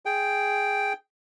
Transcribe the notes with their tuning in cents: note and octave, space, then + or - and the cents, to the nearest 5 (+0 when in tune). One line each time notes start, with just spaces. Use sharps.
G#4 +0 G5 +0